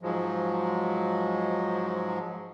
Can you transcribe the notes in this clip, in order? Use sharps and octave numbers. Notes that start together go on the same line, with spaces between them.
G#2 F3 F#3 G#3